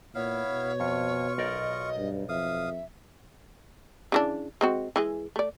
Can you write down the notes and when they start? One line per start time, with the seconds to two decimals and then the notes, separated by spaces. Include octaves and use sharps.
0.15 A#2 B3 E4 C#5 F5
0.49 B2
0.80 F2 F4 C#6
1.38 B1 A#4 D5 D#5
1.98 G2
2.29 F2 E5 F5 D#6
4.12 C#3 E3 D4
4.61 G#3 C4 F#4
4.96 E3 G#3 G#4
5.36 A3 D5